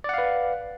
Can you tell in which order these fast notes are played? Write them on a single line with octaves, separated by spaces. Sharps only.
D5 F#5 F5 B4